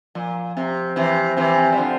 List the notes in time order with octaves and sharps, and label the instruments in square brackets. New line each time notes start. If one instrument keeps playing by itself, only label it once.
[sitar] A#2 [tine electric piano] F3
[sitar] C3 [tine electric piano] C4
[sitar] C3 E3 [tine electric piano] C4
[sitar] C3 E3 [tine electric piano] C4
[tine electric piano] C4
[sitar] G3
D3 F3